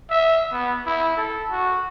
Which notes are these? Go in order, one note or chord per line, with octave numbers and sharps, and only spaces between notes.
E5
B3
E4
A4
F#4